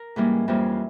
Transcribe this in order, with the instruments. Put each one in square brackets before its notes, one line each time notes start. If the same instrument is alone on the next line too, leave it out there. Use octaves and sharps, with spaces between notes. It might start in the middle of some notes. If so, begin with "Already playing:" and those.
Already playing: [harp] A#4
G#2 E3 G3 A#3 C#4
F2 E3 G3 A#3 C#4